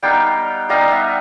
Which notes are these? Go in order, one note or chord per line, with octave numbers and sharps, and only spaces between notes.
G3 B3 D#4 F5 G5
G3 B3 D#4 D#5 F5
E5 F#5